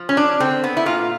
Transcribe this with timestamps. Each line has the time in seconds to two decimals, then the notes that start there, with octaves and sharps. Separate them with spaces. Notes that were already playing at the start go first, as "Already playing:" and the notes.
Already playing: F3
0.09 C#4
0.17 D4
0.40 D3 C4
0.64 B3
0.77 E4
0.86 A#2 F4